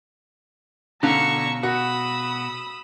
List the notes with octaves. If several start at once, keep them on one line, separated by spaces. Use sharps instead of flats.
B2 D3 C#5 F5 A#5 C#6 E6
F#4 B5 D#6 E6